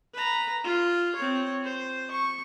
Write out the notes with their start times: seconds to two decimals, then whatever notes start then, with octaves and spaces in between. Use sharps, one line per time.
0.14 B4 A#5
0.64 F4
1.15 C4 C#5
1.63 C5
2.11 C#6